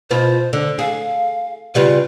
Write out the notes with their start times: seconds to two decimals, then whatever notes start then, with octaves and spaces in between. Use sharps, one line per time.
0.11 B2 F4 B4 C5
0.53 D3
0.79 G#4 F5
1.75 C#3 G3 F4 B4